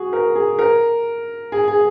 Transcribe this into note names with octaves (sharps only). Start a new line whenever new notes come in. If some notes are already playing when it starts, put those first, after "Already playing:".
Already playing: F#4 G#4
A#4
G#4
A#4
G#4
G#4